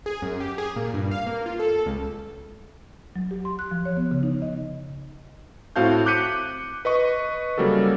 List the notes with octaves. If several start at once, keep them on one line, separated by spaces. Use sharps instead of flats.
G#4
F#2
G4
G#4
A#2
G2
F5
A#3
F4
A4
C#2
F#3
G4
C6
F#6
F3
C#5
B3
C#3
D#4
D#5
A2 C4 F#4 F5 A5 G6
D6 F#6 G6 B6 C#7 D#7
B4 D#5 C#6
C#3 F#3 G3 A#3 F#4 A4